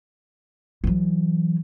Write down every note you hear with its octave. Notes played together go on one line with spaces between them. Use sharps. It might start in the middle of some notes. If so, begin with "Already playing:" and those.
E3 F#3